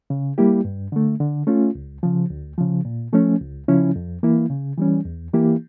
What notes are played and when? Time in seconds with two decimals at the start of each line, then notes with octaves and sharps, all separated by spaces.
0.10 C#3
0.38 G3 A#3 E4 G4
0.65 G2
0.92 D3 A3
1.20 D3
1.47 A3 C#4 F4
1.75 C#2
2.03 C#3 F3
2.30 D2
2.58 C#3 F3
2.85 A#2
3.13 F3 A3 C#4
3.41 C#2
3.68 C#3 F3 C#4 E4
3.96 F2
4.23 E3 A#3 E4
4.50 C#3
4.78 E3 G3 C#4
5.05 E2
5.34 E3 A#3 E4 G4